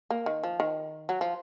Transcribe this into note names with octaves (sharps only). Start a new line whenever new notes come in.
A#3
D#3
F3
D#3
F#3
F3